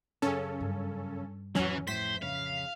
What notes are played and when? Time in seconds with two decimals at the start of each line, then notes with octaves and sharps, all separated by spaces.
0.22 F#2 C#3 C#4 A4
0.61 G2
1.55 A1 F2 E3 F#3 C#4
1.87 A2 C5 B6
2.22 C#3 F5